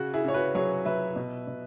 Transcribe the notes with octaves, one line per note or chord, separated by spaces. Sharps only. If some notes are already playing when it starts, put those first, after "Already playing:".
Already playing: C#3 F#4
E4 G#4
C#3 C#5
F#4 B4
F#3 G#4 C#5
F#3 B4 E5
B2
B2